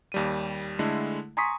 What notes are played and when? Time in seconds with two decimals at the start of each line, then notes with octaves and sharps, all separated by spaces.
0.12 D#2 G3 D#7
0.79 D3 G#3 A3 E4
1.37 G#5 A#5 C6 C#6 D#6 B6